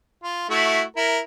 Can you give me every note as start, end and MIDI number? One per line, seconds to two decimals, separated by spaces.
0.23 0.47 65
0.49 0.82 57
0.49 0.82 64
0.49 0.82 66
0.96 1.19 64
0.96 1.19 70